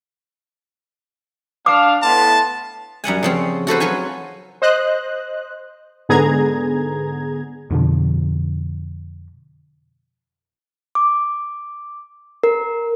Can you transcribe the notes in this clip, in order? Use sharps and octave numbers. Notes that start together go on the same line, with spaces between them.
D4 F5 D6
A2 B3 A5 C6
F#2 G3 F#5 G#5
C#3 F3 C4
F#4 A4 B4 C5
F#3 F4 B4 G#5
C5 D#5 F#6
G#2 D3 B3 G#4 A#5 G#6
F2 B2 D3 F3
D6
A#4